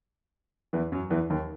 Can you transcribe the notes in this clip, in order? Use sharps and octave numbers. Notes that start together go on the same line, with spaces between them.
E2 E3
F#2 F#3
E2 E3
D#2 D#3